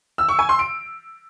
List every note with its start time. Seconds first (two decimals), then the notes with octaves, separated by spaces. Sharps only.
0.18 E6
0.29 C#6
0.39 G#5
0.49 C6
0.59 D7